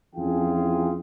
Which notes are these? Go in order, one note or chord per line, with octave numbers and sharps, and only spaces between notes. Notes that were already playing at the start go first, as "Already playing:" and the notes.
F2 E3 C#4 F4 G#4 G5